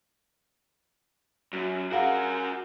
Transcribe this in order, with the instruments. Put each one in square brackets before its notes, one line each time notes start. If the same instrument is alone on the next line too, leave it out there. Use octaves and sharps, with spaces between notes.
[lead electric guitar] F#2 [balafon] F#4
[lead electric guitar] F#4 A#4 [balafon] G#4 F5 F#5